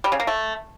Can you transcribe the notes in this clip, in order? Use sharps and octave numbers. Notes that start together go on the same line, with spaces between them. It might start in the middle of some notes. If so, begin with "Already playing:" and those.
G3
C#3
A#3
A3